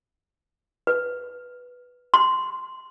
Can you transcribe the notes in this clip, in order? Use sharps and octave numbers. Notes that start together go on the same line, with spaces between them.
B4
C6